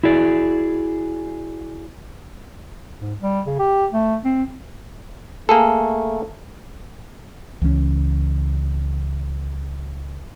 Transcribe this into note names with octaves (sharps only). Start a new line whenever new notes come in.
E4 F#4 G#4 D5
G#2
G3
C#3
G4
A3
C4
A3 A#3 G#4 A4
C#2 E3 F#3 C#4